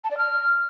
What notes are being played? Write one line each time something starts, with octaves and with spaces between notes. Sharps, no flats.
A5
D5
F6